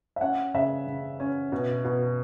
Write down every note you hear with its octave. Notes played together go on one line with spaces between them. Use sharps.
E5
C#4 F#5
C#3 E5
C#3
C#4
B2
B2